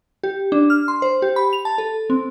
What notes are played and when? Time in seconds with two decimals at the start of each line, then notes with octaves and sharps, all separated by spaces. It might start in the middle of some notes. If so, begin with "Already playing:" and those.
0.23 G4
0.52 D4
0.70 F6
0.88 C6
1.02 C5
1.22 G4
1.36 B5
1.53 F7
1.65 A5
1.78 A4
2.10 C4